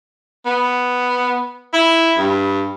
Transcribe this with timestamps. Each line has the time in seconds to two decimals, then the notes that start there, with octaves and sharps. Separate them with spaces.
0.46 B3
1.73 E4
2.18 G2